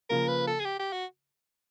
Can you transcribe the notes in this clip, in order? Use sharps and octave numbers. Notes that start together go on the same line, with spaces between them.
C#3 F3 A#3 A#4
B4
A4
G#4
G4
G4
F#4